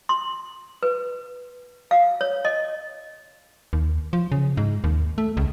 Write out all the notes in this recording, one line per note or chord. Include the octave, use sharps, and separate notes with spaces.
C6
B4
F5
C#5
D#5
D#2
F3
C#3
G#2
D#2
A3
C#2